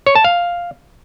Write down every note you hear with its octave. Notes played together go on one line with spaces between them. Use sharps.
C#5
A5
F5